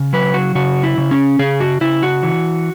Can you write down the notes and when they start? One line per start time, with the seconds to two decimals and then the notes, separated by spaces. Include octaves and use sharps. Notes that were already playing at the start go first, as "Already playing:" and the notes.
Already playing: C#3
0.13 F#3 B4
0.34 F#4
0.55 C#3 F#4
0.83 E4
0.98 C#3
1.11 C#4
1.39 C#3 G#4
1.60 F#4
1.81 C#3 E4
2.03 F#4
2.23 E3